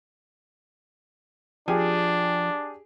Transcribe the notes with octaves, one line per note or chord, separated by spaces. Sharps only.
F3 D4 G4 G#4 G#5